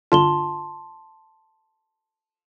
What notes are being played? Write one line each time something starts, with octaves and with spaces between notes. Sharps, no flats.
G1 D3 F4 A5 C6 G7